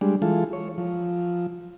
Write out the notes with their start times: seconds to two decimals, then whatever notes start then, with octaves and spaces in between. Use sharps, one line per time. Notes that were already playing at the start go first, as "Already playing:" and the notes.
0.01 G3 G#3 D4
0.22 E3 G#3 F4 A4
0.53 C#5
0.78 F3